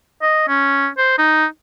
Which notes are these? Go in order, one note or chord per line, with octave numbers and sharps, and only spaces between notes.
D#5
C#4
C5
D#4